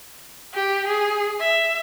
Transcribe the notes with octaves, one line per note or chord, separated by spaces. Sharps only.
G4
G#4
E5